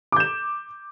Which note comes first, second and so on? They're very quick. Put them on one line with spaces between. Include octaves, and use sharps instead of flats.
D6 G6 E7